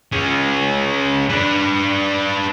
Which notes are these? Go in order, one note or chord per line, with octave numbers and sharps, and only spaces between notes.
G#3 C#4
D4 B4